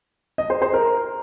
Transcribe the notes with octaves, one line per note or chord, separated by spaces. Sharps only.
D#5
C5
C5
A#4